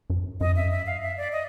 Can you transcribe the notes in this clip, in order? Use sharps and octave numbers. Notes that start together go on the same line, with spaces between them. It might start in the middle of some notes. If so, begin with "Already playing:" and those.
F#2
F#2 D#5
F2 E5
F#2
E5
F5
E5
D5
D#5